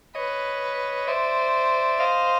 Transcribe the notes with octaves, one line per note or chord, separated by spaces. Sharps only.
B4 C#5 D#5
C5 D5 E5
C5 D#5 F5